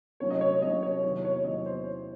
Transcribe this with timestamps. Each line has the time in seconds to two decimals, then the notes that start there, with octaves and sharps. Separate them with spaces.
0.20 C2 C3 F#3 C#4 C#5
0.30 D#5
0.41 C#5
0.62 C2 C3 F#3 C#4 D#5
0.82 C#5
1.03 E2 C3 D#3 F#3 C#5
1.25 C#5
1.44 E2 C3 D#3 F#3 D#5
1.66 C5